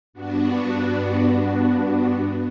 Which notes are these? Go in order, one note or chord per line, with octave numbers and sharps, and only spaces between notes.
G2 B3 D4 F#4